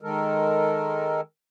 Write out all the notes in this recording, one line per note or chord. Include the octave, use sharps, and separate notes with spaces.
D#3 G#3 A4 A#4